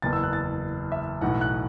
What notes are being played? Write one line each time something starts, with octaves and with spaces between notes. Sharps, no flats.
F#1 E2 E3 A6
E6
F#6
A6
E5
B1 A2 E3 F#5
F#6